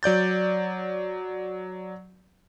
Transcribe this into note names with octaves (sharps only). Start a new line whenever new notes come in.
F#3 D5 G6 A6